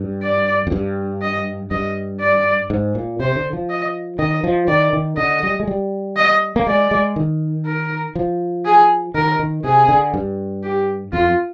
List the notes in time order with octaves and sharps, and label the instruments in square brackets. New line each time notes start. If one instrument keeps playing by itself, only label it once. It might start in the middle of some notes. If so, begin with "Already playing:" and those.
Already playing: [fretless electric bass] G2
[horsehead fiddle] D5
[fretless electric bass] F2
G2
[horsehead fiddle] D#5
[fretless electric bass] G2 [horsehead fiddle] D#5
[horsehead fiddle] D5
[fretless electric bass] G#2
A#2
[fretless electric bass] C3 [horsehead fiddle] C5
[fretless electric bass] D3
F3
[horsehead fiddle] D#5
[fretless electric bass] D#3 [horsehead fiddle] D#5
[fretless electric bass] F3
[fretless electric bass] D#3 [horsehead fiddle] D5
[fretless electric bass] D#3
[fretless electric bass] D3 [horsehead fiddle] D#5
[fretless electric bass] G3
G#3
G3
[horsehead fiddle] D#5
[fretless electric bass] A#3
[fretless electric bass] G#3 [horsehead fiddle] D5
[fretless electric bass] G#3
D#3
[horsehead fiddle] A#4
[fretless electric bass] F3
[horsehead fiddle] G#4
[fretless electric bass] D#3 [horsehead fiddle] A#4
[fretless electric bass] D#3
[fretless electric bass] C3 [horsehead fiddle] G#4
[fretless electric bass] D3
G2
[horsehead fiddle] G4
[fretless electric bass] F2 [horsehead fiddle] F4